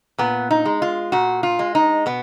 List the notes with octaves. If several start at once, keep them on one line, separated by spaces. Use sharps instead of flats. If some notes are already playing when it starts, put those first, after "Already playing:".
A#2 B3
D#4
G#3
F4
A#2 F#4
F4
G#3
D#4
B2 B3